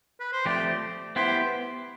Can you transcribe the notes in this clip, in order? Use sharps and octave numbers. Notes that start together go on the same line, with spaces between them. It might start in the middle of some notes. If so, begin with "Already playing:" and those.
B4
C5
F3 A3 C4 G4 D5
B3 E4 G4 C5